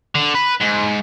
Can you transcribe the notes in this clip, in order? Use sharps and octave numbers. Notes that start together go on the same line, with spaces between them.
D3
B4
G#2